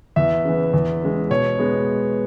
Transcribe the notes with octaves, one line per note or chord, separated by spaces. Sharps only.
E2 E5
C#3 E3
E2
C#3 G#3
B2 C#5
G#3 B3